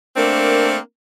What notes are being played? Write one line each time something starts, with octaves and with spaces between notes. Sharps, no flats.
A3 A#3 C4 D4 A#4